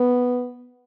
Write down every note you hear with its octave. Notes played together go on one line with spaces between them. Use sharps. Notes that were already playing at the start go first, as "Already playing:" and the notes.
Already playing: B3